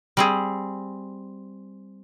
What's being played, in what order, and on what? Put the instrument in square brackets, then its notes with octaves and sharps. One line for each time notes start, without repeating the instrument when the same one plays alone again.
[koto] G3 C4 G#4